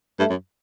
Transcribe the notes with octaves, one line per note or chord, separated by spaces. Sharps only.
G2 A3
F#2